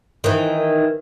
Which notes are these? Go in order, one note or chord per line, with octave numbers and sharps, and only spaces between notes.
D#3 E3